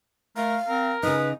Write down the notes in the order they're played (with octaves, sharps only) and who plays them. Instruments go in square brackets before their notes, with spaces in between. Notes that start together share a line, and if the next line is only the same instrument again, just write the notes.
[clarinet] A3 [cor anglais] A#4 [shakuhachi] F5
[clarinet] C4 [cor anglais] A#4
[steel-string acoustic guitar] C#3 D#4 [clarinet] B4 [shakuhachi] D#6